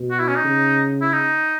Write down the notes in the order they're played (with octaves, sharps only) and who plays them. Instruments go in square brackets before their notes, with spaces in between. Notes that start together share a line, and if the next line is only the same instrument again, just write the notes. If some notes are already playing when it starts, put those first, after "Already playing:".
Already playing: [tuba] B2
[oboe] F#4
E4
C#4
D#4
[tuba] C#3
[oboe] E4
D#4